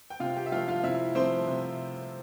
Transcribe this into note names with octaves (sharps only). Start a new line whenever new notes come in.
G5
C3 F4 F5
G4 G5
E5
F3 A3 F4 F5
F4 F5
C3 E4 E5
F3 A3 C4 C5
C3